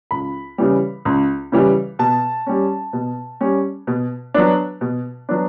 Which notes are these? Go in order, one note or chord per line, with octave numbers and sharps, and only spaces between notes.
C#2 B5
C#3 E3 G3
C#2
C#3 E3 G3
B2 A5
G3 C#4
B2
G3 C#4
B2
F#3 B3 D4
B2
F#3 B3 D4